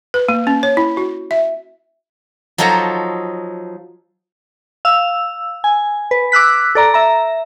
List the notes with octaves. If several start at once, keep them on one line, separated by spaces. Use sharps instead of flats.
B4
A#3
C#4
C#5
E4
F#4
E5
F3 F#3 D#4 A4 C5 A#5
F5 E6
G#5
B4
D6 E6 F#6 B6
A4 D5 A#5
E5 A#5